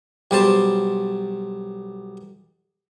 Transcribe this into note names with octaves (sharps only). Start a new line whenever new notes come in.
B1 G3 C5 A5